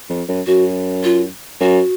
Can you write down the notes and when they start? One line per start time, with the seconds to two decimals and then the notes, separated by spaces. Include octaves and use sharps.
0.09 F2
0.28 F#2
0.47 F#2 F#4
1.04 F4
1.60 F#2 F#4